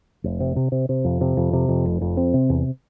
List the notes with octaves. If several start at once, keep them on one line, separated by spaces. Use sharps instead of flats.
F1
C3
C3
C3
C3
F2
C3
F2
C3
F2
F1
F2
C4
C3
E2